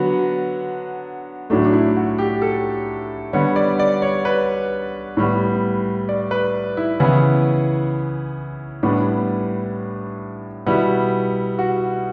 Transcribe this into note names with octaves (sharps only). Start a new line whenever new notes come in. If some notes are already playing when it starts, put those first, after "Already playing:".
Already playing: D3 F#3 B3 F#4
A2 F#3 A3 D4
D4
E4
F#4
G4
A4
D3 G3 B3 C#5
D5
D5
C#5
B4
A2 G3 B3
D5
B4
E4
C#3 E3 B3 E4
A2 G3 B3 D4
B2 G3 B3 E4
F#4